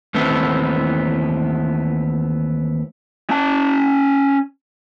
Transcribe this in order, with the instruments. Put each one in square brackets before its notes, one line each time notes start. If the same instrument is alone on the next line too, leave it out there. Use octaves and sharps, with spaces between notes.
[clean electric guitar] D#2 E3 A3 B3 C4 E4
[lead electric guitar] C#4 A5